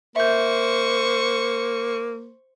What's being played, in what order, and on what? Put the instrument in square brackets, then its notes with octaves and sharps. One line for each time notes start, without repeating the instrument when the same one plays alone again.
[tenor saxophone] A#3 [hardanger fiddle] C5 C#6 [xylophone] E5 G6